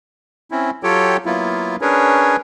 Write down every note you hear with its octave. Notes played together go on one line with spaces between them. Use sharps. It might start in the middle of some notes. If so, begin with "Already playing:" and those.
C4 C#4 E4
F#3 F4 G4 A4 C#5 G5
F#3 A#3 B3 E4 F4
C#4 D4 G#4 A#4 B4 C#5